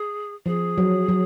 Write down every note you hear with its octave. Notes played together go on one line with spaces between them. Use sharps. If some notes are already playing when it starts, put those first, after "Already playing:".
Already playing: G#4
F3 G#4
F#3
F#3